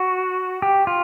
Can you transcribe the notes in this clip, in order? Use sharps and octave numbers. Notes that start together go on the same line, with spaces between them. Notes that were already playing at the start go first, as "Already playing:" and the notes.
Already playing: F#4
G4
F4